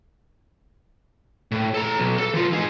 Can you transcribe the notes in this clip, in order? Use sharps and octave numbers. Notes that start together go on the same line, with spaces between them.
A2
A4 A#5
B1
A4
E3 F4
D#4 G#4